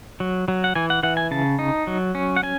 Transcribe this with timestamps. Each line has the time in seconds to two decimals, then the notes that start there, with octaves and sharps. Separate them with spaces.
0.20 F#3
0.48 F#3
0.64 F#5
0.75 E3 G#5
0.90 F#5
1.03 E3 F#5
1.17 G#5
1.31 C#3 A5
1.59 D#4
1.87 F#3
2.15 C#4
2.36 F#5
2.43 C#4 G#5